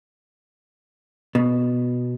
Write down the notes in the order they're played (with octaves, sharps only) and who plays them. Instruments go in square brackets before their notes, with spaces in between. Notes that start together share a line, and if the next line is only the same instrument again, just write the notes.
[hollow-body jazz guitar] B2